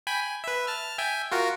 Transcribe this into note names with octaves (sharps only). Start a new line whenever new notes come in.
G5 G#5 B5
G#5
B4 E5
A5 F6
E5 G5 G#5
F4 F#4 A#4